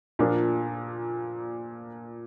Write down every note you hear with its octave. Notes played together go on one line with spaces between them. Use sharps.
A#2 F3 A#3 D4